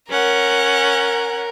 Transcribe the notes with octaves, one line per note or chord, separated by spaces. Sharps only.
C#4 A#4 F#5